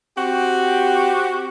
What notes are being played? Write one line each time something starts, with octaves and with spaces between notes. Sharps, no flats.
C4 F#4 G4